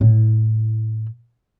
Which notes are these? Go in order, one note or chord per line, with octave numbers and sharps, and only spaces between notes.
A2 E4